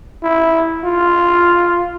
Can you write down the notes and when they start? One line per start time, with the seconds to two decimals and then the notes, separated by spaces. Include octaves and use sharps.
0.23 E4
0.85 F4